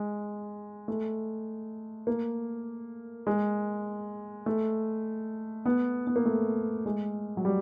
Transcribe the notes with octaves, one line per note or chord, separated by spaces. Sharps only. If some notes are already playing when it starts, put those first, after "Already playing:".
Already playing: G#3
A3
A#3
G#3
A3
B3
B3
A#3
A3
G#3
F#3
G3